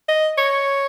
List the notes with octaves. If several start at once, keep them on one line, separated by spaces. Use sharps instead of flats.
D#5
C#5